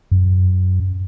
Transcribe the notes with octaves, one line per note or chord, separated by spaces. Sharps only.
F#2